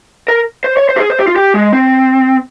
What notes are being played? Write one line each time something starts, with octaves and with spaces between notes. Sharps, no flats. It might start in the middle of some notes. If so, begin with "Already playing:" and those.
A#4
C5
C#5
C5
G4
G#4
C5
G4
F4
G4
G#3
C4